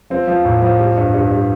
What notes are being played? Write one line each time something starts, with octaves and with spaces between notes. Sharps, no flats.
F3 C4
F3
A2
F3
G3
G2
G2
G3